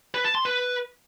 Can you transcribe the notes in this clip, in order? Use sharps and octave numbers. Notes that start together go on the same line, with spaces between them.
B4
A5
C6
B4